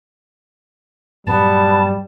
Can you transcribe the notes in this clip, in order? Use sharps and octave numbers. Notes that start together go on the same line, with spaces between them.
G2 A#2 F#3 G3 B3 A5